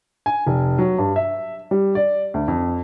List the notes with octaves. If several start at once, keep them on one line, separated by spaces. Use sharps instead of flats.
G#5
F1
F#3
G2
E5
G3
D5
D2
F2